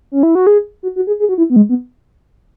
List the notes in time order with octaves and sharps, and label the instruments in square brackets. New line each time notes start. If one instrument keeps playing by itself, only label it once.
[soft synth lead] C#4
E4
F#4
G#4
F#4
F#4
G#4
G#4
F#4
E4
B3
G#3
B3